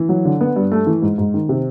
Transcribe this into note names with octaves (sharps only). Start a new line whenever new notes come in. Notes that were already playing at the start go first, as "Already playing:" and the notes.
Already playing: E3
F#3
D3
B3
G2
A3
E3
G#2
G#2
D#3
C3